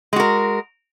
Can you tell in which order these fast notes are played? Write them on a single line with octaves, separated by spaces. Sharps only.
G#3 F#4 A#4